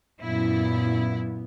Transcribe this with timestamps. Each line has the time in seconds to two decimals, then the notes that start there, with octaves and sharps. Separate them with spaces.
0.21 F#2 A#2 B3 E4